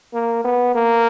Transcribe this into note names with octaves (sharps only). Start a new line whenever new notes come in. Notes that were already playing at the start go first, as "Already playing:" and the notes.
A#3
B3
A#3